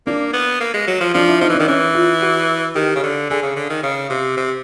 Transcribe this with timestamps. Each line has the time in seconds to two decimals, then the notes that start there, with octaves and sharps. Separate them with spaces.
0.07 A#3 D4
0.33 B3
0.60 A#3
0.74 G#3
0.87 F#3
1.01 F3
1.14 F3 D4
1.28 E4
1.41 F3 D#4
1.50 E3
1.55 D#3 D4
1.68 E3 C#4
1.94 F4
2.22 F#4
2.75 D#3 G4
2.96 C#3
3.03 D3
3.30 D3 G#4
3.43 C#3
3.56 D3
3.70 D#3
3.83 C#3
4.10 C3
4.37 C3